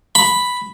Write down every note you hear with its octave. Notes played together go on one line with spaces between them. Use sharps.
B5